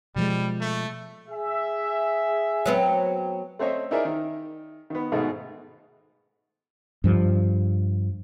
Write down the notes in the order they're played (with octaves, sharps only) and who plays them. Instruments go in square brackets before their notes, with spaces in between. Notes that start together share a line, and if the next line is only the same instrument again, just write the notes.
[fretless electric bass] B2 F3 G#3 [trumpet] G3
[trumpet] A3
[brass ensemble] G#4 E5
[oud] F#3 B3 C4
[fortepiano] A3 C4 C5 C#5 D#5 E5
D#4 E4 G#4 A#4 D5 E5
D#3
D#3 B3
G#2 B2 D#3 G#3 A3
[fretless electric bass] G2 F3